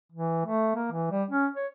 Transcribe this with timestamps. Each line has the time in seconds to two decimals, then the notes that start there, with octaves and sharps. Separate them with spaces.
0.12 E3
0.45 A3
0.76 A#3
0.91 E3
1.11 G3
1.31 C#4
1.56 C#5